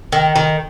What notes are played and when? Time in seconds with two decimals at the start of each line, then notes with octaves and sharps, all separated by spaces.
0.12 D#3
0.36 D#3